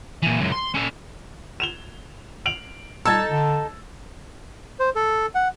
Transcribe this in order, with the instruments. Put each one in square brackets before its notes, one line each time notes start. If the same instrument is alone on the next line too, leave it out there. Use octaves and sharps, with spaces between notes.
[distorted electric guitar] A#2 E3
C#2 F#2
C6
C#4 A4
[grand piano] E7 F7 G7
D7 F7 F#7
[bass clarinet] G3 [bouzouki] D#4 A4 [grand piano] E6 G#6 A6
[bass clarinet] D3
[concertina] C5
A4
F#5